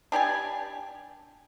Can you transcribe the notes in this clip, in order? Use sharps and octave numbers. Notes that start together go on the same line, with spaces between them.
D4 G4 D5 G#5